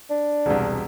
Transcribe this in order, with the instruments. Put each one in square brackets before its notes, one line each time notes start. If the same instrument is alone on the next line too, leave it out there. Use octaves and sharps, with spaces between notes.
[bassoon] D4
[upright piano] E1 C2